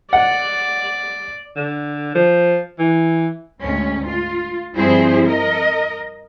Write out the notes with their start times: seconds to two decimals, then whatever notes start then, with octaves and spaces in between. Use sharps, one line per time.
0.13 D5 F#5
1.56 D3
2.15 F3
2.79 E3
3.61 D2 G#2 C#4
4.06 F4
4.73 G2 F3 C4 E4 G#4 C5
5.25 A#4 D#5